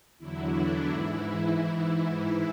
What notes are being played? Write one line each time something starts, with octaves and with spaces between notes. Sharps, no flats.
E2 D3 F#3 E4
D4
G#2 E3 E4